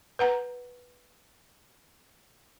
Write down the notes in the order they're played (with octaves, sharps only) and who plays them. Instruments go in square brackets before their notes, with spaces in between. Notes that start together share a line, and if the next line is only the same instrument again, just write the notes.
[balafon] B4 F#5 A#5